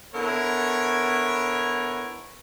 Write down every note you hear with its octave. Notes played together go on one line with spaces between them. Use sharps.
D3 B3 E4 A#4 C#5